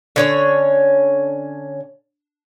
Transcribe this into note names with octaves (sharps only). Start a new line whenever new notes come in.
D3 C#4 C#5